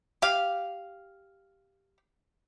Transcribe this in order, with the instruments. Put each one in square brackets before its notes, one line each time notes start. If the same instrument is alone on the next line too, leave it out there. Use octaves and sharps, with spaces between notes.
[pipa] G4 F5